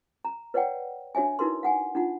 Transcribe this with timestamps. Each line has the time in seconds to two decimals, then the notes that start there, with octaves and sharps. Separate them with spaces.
0.25 A#5
0.54 B4 C#5 D5 F#5 G5
1.15 D4 F#4 C#5 E5 G#5
1.39 D#4 E4 F#4 A#4 B4 C6
1.63 F5 F#5 G#5
1.95 D4 D#4 F4 F#5